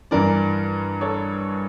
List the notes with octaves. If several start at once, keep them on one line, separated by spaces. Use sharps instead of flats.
G2 E3 A#4 D5
A4 C#5